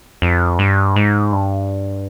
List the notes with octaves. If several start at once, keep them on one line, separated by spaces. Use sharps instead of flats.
F2
G2
G#2
G2